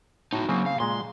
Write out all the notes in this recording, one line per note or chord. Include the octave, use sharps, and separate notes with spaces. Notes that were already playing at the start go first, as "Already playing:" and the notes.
A2 D#4 F#4
C#3 F#3 A#3 C4
F5
A#2 G#3 C6